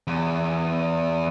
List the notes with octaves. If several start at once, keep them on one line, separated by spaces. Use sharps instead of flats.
E2